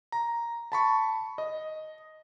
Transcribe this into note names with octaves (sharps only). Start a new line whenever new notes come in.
A#5
A5 B5 C#6
D#5